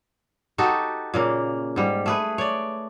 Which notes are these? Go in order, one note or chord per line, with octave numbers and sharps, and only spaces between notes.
D#4 F#4 G4 A4
A#2 C#3 A#3
G#2 G3
A3 G#4 B4
C#5 D5